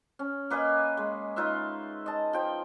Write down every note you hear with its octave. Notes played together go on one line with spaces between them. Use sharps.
C#4
A#3 B4 D#5 G#5
G#3
D#4 F4 B4 E5
D#5 A5
F3 G5